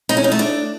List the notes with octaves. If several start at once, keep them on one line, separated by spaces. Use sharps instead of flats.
D#4
C#4
D#4
A3
D4